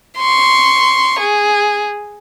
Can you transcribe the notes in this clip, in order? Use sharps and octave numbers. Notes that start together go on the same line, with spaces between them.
C6 C#6
G#4